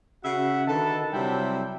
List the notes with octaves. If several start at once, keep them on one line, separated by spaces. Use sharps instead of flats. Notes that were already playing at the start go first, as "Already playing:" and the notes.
C#3 F#4 E5 F#5
D3 D#3 A4 B4 A5
C3 F#3 G3 C4 E4 G5